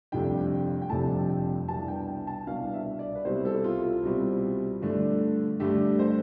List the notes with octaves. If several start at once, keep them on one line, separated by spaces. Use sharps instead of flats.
F1 F2 C3 G3 D4 G5
G5
F1 F2 C3 G3 D4 A5
G5
C2 B2 B3 D4 A5
G5
G5
A5
C2 B2 B3 D4 F5
E5
D5
B4
C2 B2 G3 C4 C5
A4
F4
F4
C2 B2 G3 C4
G2 D3 A3 D4
G2 D3 A3 D4 G4
C5